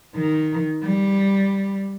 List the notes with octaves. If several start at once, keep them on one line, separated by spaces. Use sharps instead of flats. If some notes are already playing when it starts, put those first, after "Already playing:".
D#3
G3